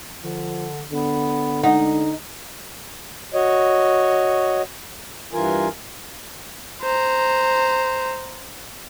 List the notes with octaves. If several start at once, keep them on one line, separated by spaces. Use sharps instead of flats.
D3 F3
D3 B3
G#3 D#4 F#5
F#4 C#5 D#5
G2 E3 F4 A#4 G#5
C5 A#5